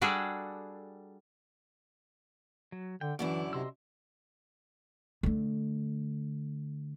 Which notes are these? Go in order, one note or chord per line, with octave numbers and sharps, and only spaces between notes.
G3 D4 F#4 G#4 A4
F#3
D3 G5
F#2 D3 E3 E4 D5
C3 D#5 C6 E6
D3 A3